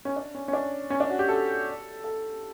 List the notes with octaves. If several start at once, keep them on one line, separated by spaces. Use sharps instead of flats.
C#4
D4
C#4
C#4
D4
C#4
D4
F#4
G4
A4
A4